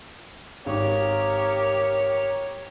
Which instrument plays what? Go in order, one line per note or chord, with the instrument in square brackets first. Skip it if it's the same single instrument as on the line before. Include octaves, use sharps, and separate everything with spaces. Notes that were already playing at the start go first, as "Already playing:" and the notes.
[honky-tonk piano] G#1 [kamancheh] G4 A#4 [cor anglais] C#5